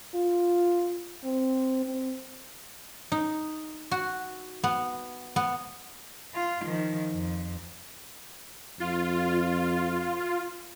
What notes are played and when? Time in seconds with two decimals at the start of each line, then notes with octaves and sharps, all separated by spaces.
0.15 F4
1.24 C4
1.86 C4
3.12 D#4
3.91 F#4
4.64 B3
5.36 B3
6.34 F4
6.65 D#3 F3
7.11 F2
8.80 F2 F4